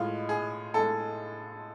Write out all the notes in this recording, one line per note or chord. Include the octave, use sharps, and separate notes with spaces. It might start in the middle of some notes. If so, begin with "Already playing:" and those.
Already playing: A2 G#3 F4
G#4
A2 G#3 A4